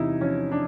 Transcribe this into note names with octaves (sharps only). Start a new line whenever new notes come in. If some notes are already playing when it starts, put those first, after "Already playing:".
Already playing: E2 C3 D#4 E4
F3 C#4
D4